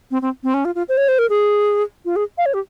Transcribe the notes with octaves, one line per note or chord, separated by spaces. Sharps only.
C4
C4
C4
C#4
F4
F4
C5
C#5
C5
A#4
G#4
F4
G#4
F5
C#5
G4